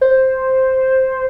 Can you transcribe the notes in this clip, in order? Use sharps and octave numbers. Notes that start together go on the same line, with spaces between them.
C5